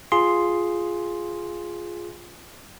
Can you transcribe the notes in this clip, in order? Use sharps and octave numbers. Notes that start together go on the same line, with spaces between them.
F4 G#4 C6